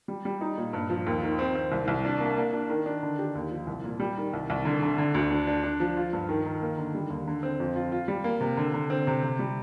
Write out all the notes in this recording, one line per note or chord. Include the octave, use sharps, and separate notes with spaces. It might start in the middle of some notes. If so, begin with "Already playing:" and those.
G3
G3
D#4
A#2
G2
F3
D#2
D#3
C4
C4
C2
C2
D4
A#3
A#3
D4
D#3
D4
D3
G4
D#2
F3
C2
A#2
G3
D#3
C2
C2
D3
D3
D3
D2
D4
D4
D4
F3
F4
G2
D#3
D#3
A#3
D3
G3
D#2
D3
C4
F2
F4
F4
G3
A#3
C3
D3
D3
C4
C3
C3
G3